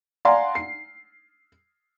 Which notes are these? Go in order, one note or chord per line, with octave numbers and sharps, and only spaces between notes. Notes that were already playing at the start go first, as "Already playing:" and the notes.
D5 F5 F#5 G#5 A#5 C6
C7